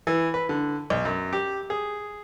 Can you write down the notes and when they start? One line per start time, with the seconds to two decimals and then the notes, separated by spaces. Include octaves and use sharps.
0.07 E3
0.34 B4
0.49 D3
0.90 B1
1.05 F#2
1.33 G4
1.70 G#4